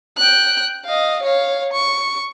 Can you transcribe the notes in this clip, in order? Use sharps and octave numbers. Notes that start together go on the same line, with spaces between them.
G5 F#6
D#5 F5
C#5 F5
C#6